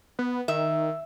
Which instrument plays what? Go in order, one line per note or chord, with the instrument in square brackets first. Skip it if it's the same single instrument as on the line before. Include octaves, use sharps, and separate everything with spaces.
[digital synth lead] B3
[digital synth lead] D#3 [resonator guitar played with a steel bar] E5